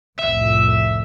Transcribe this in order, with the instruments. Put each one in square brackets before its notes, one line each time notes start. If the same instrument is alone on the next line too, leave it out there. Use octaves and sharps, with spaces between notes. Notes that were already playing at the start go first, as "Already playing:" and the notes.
[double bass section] C2 F2 A2 [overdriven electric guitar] E5